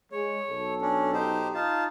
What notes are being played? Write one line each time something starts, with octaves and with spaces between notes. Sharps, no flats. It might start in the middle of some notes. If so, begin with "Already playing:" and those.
G#3 C#5
B1 A4
C#4 D4
D#4 G4 C5
D#4 F4 A5